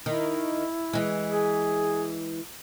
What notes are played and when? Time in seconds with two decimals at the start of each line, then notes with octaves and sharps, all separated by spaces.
0.06 D#3 E4
0.93 E3 G#3
1.30 G#4